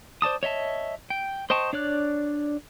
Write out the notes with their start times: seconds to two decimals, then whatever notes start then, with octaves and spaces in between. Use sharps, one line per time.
0.22 C5 D5 A5 D#6
0.43 C#5 D#5 E5 A5
1.10 G5
1.50 C5 D#5 G5 A5 C#6
1.73 D4 C#5 D5 F#6